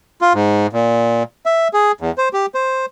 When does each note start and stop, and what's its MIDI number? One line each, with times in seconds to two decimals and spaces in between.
0.21 0.33 65
0.34 0.67 44
0.73 1.23 46
1.46 1.68 76
1.73 1.92 68
2.01 2.12 40
2.18 2.29 72
2.33 2.46 67
2.54 2.86 72